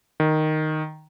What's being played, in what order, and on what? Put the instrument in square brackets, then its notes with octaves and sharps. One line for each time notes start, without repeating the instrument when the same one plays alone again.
[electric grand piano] D#3